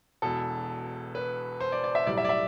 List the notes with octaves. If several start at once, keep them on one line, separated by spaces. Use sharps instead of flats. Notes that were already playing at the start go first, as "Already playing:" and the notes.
E1 E2 B2 A4
B4
C5
D5
D5
E5
B1 A2 G3 D5
E5
D5
E5